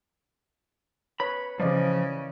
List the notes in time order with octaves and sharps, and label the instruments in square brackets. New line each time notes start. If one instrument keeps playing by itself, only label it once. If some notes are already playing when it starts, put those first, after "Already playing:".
[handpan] B4 C#5 [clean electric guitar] B5
[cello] C#3 [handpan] E3 D5 D#5 [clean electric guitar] F3